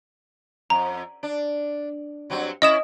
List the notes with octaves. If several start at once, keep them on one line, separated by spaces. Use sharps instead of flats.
F2 A#5
D4
G2 F#3 C4
C#4 E4 D#5 E5 D#6 E7